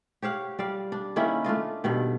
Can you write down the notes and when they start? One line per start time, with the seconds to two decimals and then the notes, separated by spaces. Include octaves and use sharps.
0.22 G4 C#5 F5 F#5
0.59 G3 D5 F5
0.92 D4
1.16 D#3 A#3 C#4 E4
1.44 A3 D4 F4 D#5
1.84 G2 B2 D#3